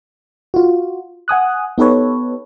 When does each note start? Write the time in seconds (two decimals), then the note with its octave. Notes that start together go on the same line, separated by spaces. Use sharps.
0.54 F4 F#4
1.28 F#5 G#5 D#6 F#6
1.78 B3 D#4 G4 A4 B4 C#5